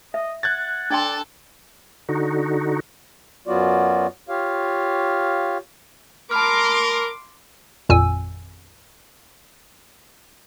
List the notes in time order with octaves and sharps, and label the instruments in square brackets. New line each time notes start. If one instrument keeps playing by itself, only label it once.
[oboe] D#5 [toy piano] E5
[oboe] F#5 [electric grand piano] F#6 G#6 A6
[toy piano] D4 G5 C6 [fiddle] A4 A5 [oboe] D5
[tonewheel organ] D3 D#4 F#4
[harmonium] F#2 F#3 B3 F4 F#4 D5
F4 G4 C#5 F5
[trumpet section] A#4 [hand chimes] A5 B5 F6 [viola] C6 D6
[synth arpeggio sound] G#1 F2 A#2 G#5 E6